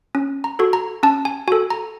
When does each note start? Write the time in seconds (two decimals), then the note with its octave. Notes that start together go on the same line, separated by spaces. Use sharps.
0.15 C#4
0.44 A#5
0.59 F#4 A4
0.73 A#5
1.03 C#4 A5
1.25 G#5
1.48 F#4 G#5
1.52 A4
1.70 A#5